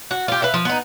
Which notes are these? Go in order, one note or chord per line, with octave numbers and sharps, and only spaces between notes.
F#4
F4 G4
B4 E5 F5
F3
B3 D#4